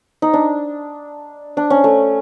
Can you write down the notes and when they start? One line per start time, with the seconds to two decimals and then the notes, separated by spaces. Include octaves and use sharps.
0.22 D#4
0.33 D4
1.57 D4
1.70 C#4
1.84 A3